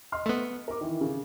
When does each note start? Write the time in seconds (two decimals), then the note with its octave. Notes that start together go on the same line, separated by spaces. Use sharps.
0.12 D#5 C6 F6
0.26 A3 B3
0.68 A#4 D6
0.81 D#3 E3
1.01 C#3